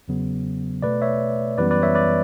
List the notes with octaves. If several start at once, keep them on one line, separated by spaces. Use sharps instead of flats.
E2 C#3 F#3 B3
B2 A3 B4 D5
C#5 E5
F#2 E3 G3 B3 B4 D5
B4 D5
C#5 E5
B4 D5